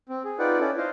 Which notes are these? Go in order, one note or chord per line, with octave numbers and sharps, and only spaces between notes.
C4
G#4
D#4 F4 B4 D5 F#5 G5
C#4 E4 A4 D5
C5 D#5 F5